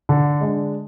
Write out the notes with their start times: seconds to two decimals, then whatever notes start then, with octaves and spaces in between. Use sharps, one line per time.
0.09 D3
0.41 G#3 D4